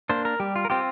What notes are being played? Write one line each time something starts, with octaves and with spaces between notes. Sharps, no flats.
A#3 D4 C5
A#4
G3 G4
F4
A#4
C4 F4 G4